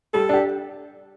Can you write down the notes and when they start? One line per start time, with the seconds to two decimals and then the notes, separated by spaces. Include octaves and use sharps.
0.14 G3 A4
0.29 D4 G4